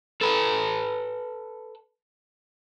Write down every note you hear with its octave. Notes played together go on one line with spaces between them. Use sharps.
A4 B4